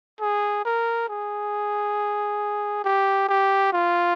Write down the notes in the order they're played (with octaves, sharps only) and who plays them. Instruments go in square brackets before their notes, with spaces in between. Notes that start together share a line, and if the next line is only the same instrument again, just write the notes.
[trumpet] G#4
A#4
G#4
G4
G4
F4